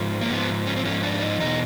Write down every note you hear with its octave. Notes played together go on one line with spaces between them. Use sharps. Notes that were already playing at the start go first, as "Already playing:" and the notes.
Already playing: G#2 F3
A#3
G#2 F3 B3
C#4
C4
G#2 F3 C#4
D4
D#4
E2 B2 D#4